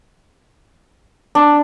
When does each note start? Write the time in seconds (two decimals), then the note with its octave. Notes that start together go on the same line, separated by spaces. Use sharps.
1.35 D4